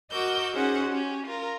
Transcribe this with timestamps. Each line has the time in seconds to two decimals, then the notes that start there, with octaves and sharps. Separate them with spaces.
0.12 F#4 A#4 D#5 D6 E6 G6
0.54 C#4 D#4 F#4 G#4 C5 F#5
0.89 C#4 G4
1.27 F4 A#4